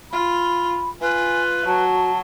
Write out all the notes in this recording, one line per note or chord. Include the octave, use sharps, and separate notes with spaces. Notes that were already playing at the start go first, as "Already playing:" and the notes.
F4 B5
F4 B4 G#5
F#3 F#4 A5